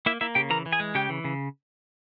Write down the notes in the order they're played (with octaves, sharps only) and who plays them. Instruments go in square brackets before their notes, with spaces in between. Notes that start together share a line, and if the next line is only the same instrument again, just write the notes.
[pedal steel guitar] A#3 E4 E5
A#3 E4 E5
C#3 G4 G5
E3 A#4 A#5
E3
G#4 G#5
G#3
C#3 G4 G5
E3
C#3